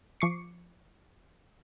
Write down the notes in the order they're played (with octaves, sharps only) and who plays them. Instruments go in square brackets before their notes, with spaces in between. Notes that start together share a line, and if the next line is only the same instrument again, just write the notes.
[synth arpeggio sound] F3 C#6 D6 C7 C#7